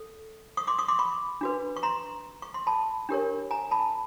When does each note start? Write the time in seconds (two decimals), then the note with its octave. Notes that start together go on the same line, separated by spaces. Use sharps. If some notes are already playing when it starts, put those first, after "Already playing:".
Already playing: A4
0.57 C#6 D#6
0.67 C6 D6
0.78 C#6 D#6
0.88 C6 D6
0.99 B5 C#6
1.41 D4 F#4 B4
1.76 C#6
1.83 A#5 C6
2.42 C#6
2.54 C6
2.67 A5 B5
3.09 D4 G4 A#4 C#5
3.51 G#5 A#5
3.71 A5 B5